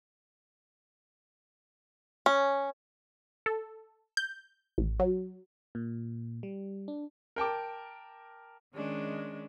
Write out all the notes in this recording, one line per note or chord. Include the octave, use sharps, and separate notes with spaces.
C#4
A4
G6
A1
F#3
A#2
G3
D4
A#4 G5 A5 D6
D#3 G#3 C#4 D4